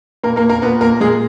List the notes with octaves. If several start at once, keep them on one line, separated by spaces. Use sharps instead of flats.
A#2 A#3 A#4
A#3 A#4
A#3 A#4
A#2 B3 B4
A#3 A#4
A#2 G#3 G#4